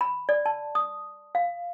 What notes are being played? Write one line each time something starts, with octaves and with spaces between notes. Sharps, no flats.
B5
D5
A5
D#6
F5